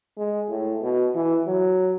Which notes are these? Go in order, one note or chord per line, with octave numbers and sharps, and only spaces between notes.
G#3
A2
B2
E3
F#3